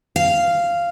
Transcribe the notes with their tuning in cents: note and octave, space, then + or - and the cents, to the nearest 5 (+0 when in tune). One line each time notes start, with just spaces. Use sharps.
F5 -10